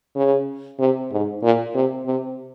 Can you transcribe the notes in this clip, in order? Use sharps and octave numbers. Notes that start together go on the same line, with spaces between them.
C#3
C3
G#2
A#2
C3
C3